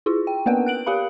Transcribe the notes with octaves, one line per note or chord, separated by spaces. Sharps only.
E4 F4 G#4
G5
A#3 B3 A#4 B4 F#5
F#6 D7 F#7
G4 A#4 F5 B5